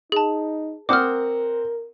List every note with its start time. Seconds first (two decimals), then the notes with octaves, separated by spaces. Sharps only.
0.12 D#4 G#4 A5
0.89 C4 A#4 F#5 D6 D#6 F6